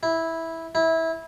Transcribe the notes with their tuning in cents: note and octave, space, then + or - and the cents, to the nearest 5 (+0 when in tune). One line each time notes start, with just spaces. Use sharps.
E4 -10
E4 -20